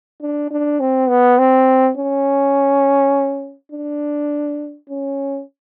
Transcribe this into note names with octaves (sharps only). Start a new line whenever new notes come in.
D4
D4
C4
B3
C4
C#4
D4
C#4